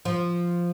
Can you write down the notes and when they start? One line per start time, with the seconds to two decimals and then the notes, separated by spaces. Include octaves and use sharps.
0.05 F3